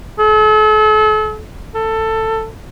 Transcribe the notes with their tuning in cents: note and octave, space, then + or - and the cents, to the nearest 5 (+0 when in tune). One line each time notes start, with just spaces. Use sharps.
A4 -40
A4 +15